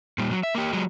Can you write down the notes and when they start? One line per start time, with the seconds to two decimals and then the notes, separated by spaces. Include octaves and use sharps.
0.18 A#2 G3
0.31 F#3
0.43 E5
0.55 A#3 G4
0.73 F#3 G#3